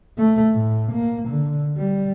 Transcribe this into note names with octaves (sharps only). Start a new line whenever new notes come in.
A3
A2
A#3
D3
G3